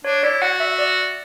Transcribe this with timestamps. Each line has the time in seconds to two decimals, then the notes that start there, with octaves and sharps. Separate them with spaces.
0.05 D4 C#5
0.23 E4 D5
0.42 F#4 F#5
0.60 E5
0.79 D5